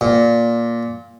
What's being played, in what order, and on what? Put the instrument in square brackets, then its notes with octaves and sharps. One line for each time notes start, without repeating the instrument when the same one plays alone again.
[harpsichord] A#2